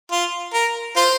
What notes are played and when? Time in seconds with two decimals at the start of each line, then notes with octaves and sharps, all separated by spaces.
0.12 F4
0.53 A#4
0.96 F4 C5